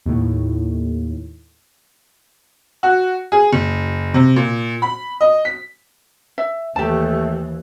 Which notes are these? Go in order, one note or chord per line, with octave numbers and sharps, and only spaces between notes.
D#2 A2
F#4
G#4
F#1
C3
A#2
B5
D#5
B6
E5
D#2 E3 A3 G4 A5